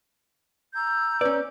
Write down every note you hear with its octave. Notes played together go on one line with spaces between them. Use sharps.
A#5 E6 G6
C#4 B4 D5